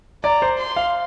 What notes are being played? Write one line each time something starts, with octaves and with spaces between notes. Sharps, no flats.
D5 A#5
C5
C6
F5